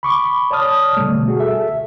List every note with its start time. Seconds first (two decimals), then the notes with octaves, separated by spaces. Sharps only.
0.03 B5 C#6 D6
0.51 C#5 D5 A5 D#6 F6
0.97 B2 D3 G3 A3
1.28 F#4 G#4
1.40 A4 E5